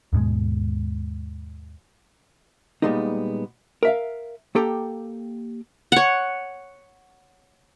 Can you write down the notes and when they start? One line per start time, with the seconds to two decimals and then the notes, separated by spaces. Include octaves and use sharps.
0.13 D#2 G#2 B2 G#3
2.82 A#2 C#3 G3 G#3 B3 D#4
3.83 A#4 E5 F5
4.55 A#3 G4 A4 G5 A#5
5.92 C#5 F#5